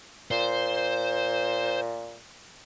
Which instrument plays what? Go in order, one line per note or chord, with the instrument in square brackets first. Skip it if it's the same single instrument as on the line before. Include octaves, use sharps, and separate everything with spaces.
[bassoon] A#2 [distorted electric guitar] C5